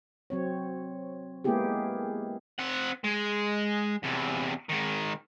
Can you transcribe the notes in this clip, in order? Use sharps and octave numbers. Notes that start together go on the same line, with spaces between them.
F#3 C4 C#5
G#3 A#3 B3 E4 G4 G#4
C4 F#5
G#3
E2 C3
G#2 D#3